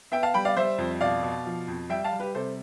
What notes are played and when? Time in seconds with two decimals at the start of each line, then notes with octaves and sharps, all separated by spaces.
0.12 B3 E5 G5
0.23 F5 A5
0.34 G3 G5 B5
0.45 D5 F5
0.57 G3 C5 E5
0.78 F2
1.01 B2 D5 F5
1.23 B2
1.45 F3
1.68 F2
1.90 G3 E5 G5
2.04 F5 A5
2.12 G3
2.20 G4 B4
2.35 C3 A4 C5